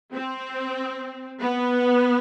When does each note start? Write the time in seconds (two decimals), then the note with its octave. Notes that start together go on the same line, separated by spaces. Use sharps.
0.14 C4
1.40 B3